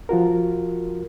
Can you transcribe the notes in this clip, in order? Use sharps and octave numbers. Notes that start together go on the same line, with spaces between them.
F3 F4 F#4 A#4